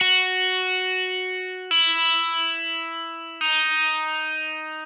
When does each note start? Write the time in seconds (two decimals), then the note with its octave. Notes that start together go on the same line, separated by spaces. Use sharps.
0.01 F#4
1.71 E4
3.41 D#4